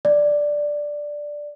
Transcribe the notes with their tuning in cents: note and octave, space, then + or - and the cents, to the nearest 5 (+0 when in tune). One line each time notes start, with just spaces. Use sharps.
D5 +0